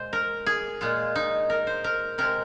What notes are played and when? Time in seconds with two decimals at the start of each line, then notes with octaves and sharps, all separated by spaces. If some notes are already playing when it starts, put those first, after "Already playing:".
Already playing: A#2 G#3 C5
0.13 A#4
0.46 G#4
0.81 A#2 G#3 F4
1.15 D#4
1.50 A#4
1.67 C5
1.84 A#4
2.18 C3 G#3 A#4